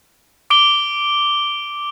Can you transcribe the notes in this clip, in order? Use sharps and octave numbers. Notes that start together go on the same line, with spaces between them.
D6 D7 G7